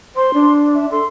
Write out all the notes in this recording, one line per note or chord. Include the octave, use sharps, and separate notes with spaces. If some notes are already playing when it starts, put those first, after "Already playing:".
C5 C6
D4
E5
A4 C6